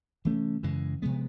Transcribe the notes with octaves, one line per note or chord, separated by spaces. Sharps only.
C3 E3 A3 C#4
F#2 C#3 E3 G#3
C3 F3 G#3 B3